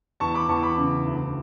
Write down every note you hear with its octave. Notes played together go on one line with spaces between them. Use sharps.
E2 A5 C#6
B5 D6
E2 A5 C#6
B5 D6
C#3
D2